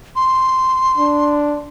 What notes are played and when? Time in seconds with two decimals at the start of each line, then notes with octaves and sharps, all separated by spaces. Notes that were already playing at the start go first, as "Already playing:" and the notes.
0.16 C6
0.98 D4